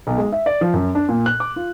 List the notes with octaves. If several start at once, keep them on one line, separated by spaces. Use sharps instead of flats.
B1
G#3
E5
D5
F3
F#2
D4
A#2
F#6
D6
F4